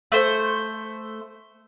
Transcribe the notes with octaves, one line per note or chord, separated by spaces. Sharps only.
A3 C5